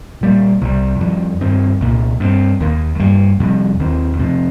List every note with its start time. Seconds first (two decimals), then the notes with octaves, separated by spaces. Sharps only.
0.21 A#2 G3 A#3
0.61 C2 C3 G3
1.00 F2 D#3 G3
1.40 G2 D#3 C4
1.80 C2 A#2 A#3
2.20 G2 F3 C4
2.60 D#2 D#3 A#3
2.99 G2 G3 A#3
3.40 F2 C3 G3
3.79 D#2 D#3 C4
4.19 F2 C3 F3 C4